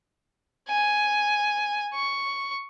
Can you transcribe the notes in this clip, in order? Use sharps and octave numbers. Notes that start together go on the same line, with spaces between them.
G#5
C#6